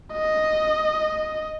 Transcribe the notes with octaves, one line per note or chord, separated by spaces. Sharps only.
D#5